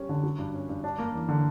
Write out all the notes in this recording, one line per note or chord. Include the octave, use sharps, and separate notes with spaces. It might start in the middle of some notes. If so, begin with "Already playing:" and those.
Already playing: G3 C#4
D3
F#3
G2
C#4
G2
D4
A#3
E2
D3